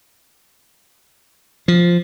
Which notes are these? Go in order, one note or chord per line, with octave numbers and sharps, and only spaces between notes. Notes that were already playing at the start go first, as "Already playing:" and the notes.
F3